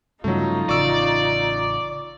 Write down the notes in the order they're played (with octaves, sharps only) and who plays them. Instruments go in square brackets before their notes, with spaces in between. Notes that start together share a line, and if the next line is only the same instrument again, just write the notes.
[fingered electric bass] G2 C#3 F3 [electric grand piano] F#3 A3 [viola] D#4 F4
[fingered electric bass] A1 C#3 [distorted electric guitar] D5 [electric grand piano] C#6 E6